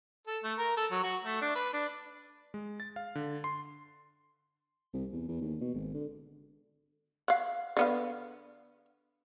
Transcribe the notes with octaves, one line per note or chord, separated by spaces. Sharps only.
A4
A3
A#4
A4
F#3
F#4
A3
D4
B4
D4
G#3
A6
F5
D3
C6
C2
E2
E2
D#2
B2
G#1
D3
F5 F#5
D3 B3 F5